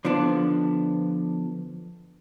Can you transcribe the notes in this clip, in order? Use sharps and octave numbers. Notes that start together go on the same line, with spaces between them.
D3 F3 B3 D4